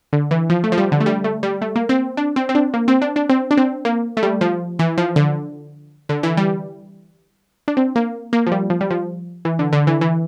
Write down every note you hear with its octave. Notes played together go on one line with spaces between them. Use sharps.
D3
E3
F3
A3
F3
G3
D3
A3
G3
A3
G3
A3
A#3
C4
D4
C4
C4
D4
A#3
C4
D4
D4
C4
D4
C4
A#3
A3
G3
F3
E3
F3
D3
D3
E3
G3
D4
C4
A#3
A#3
F3
G3
F3
G3
F3
E3
D3
D3
E3
E3